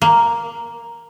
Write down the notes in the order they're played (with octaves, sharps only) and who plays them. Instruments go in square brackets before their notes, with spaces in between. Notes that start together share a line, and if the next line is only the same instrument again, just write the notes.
[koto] A#3